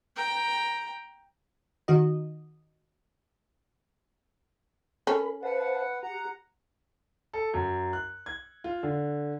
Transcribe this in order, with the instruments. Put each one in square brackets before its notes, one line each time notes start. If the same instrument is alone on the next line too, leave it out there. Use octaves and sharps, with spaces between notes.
[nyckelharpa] G5 A#5
[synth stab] D#3 F#4 D#5
[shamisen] C#4 A4 [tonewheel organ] A#4 B5
[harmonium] B4 F#5 [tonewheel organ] C5 F5 A5
[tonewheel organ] G4 [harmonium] F#5 A#5
[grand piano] A4
F#2
F#6
G#6
F4
D3